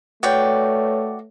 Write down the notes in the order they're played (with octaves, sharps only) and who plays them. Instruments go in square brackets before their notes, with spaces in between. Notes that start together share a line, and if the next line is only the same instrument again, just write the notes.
[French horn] A3 [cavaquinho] F#4 D5 G5 [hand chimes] B4 C#5